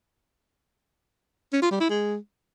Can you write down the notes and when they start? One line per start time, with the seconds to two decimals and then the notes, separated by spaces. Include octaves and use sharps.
1.53 C#4
1.62 F4
1.71 G3
1.80 E4
1.90 G#3